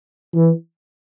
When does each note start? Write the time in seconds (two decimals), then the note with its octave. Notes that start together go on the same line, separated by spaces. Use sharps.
0.35 E3